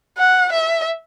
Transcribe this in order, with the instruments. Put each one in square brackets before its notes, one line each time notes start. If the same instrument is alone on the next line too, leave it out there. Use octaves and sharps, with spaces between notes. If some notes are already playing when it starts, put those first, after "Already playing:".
[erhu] F#5
E5